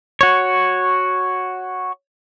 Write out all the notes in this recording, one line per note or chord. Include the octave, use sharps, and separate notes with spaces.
F#4 C#5